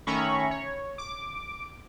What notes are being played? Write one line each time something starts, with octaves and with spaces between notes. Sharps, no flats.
D#3 A3 C#4 A#5 B5 C#6
C#5
D6